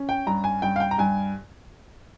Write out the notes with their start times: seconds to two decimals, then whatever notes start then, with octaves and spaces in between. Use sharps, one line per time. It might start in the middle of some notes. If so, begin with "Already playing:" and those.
Already playing: C#4
0.09 G5
0.27 G2 A#5
0.44 G#5
0.62 G2 G5
0.76 F5
0.80 G5
0.91 A#5
0.98 G2 G#5